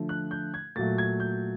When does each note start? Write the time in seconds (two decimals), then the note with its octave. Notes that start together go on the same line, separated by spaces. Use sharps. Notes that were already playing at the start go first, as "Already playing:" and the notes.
Already playing: D3 F3 A3
0.09 F#6
0.31 G6
0.54 G#6
0.76 A#2 F#3 A3 A6
0.98 G#6
1.20 G6